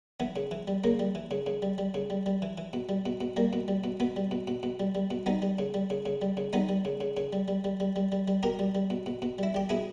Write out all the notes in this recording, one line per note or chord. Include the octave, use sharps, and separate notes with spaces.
E3 B3
C#3
E3
G3
C#3 A#3
G3
E3
C#3
C#3
G3
G3
C#3
G3
G3
E3
E3
B2
G3
B2
B2
G3 A#3
B2
G3
B2
B2 B3
G3
B2
B2
B2
G3
G3
B2
G3 B3 D#4
G3
C#3
G3
C#3
C#3
G3
C#3
G3 B3 D#4
G3
C#3
C#3
C#3
G3
G3
G3
G3
G3
G3
G3
B2 G4 A#4
G3
G3
B2
B2
B2
G3 E4
G3 G4
B2 E4 G#4